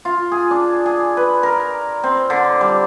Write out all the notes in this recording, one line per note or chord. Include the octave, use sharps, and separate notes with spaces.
F4
G#4
D4
G#4
B4
A#4
C4
D3
G3